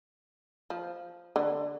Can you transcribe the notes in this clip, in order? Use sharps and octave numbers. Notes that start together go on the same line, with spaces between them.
F3
D3